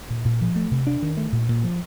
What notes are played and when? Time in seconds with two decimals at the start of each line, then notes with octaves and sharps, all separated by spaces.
0.10 A#2
0.25 A#2
0.41 F3
0.56 A3
0.71 C3
0.87 D4
1.02 D#3
1.17 A3
1.32 A#2
1.49 A#2
1.64 F3